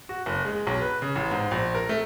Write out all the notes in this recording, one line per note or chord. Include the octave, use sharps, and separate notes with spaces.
F#4
F#1
G#3
B1
B4
C#3
A1
G#2
A#1
A#4
A3